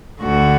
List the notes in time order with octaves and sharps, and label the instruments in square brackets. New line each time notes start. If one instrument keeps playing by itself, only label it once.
[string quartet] D2 D3 F#4